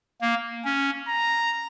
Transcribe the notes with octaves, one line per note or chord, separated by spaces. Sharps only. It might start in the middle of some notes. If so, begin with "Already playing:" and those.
A#3
C#4
A#5